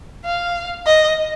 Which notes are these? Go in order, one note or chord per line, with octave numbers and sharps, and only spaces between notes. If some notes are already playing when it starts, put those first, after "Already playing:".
F5
D#5